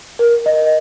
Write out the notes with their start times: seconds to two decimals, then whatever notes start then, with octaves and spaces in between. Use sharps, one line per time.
0.19 A#4
0.46 D#5